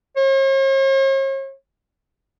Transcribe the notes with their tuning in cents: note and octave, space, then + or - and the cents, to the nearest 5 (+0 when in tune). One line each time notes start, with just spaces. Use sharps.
C#5 -45